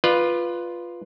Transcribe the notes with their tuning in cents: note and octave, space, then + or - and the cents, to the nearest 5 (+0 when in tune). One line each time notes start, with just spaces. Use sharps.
F4 +0 B4 +0 D5 +40